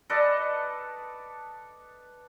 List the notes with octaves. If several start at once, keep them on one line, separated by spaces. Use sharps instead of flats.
A4 B4 D5 D#5